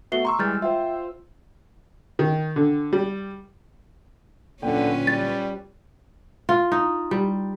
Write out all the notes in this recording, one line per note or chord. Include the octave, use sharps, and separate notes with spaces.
A3 B3 F#4 E5 C7 G7
A#5 C6 C#6 E6
E3 G3 G#3 F6 G6 A6
F4 C5 E5 G5
D#3
D3
G3
D1 A#2 D3 C#4 F4 B4 G5
G3 A6
F4
D#4
G3